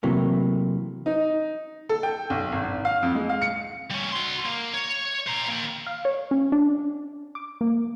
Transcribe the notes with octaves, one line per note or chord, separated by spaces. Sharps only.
C3 E3 F#3 A3 A#3
D#4
A4
G5
B1
G#1
G#1
F5
F2
G#3
F5
C#7
G3 C#4
F#4 C6
A#3
C#5
C5 A#5
A#3 G5
F5
C#5
C#4
D4
D6
A#3